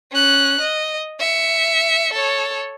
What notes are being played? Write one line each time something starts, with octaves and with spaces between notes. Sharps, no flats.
C#4 F#6
D#5
E5 C#7
A4 C#5